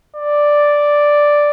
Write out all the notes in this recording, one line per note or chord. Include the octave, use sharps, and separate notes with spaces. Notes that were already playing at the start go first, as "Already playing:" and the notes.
D5